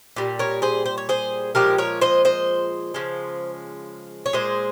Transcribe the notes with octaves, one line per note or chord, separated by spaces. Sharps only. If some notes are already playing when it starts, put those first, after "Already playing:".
A#2 G3
A#4 C#5
G#4 C5
C5
C#5
G#4 C5
A#2 F3 G#3 G4 A#4
A#4 C#5
C5 D#5
C5 D#5
C#3 F3 G#3
C#5
A#2 G#3 G#4 C5